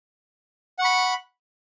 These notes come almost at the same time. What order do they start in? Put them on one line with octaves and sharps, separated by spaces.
F#5 C#6 B5